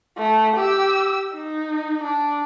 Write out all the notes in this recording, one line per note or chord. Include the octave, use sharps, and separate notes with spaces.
A3
G4 E6
D#4
D4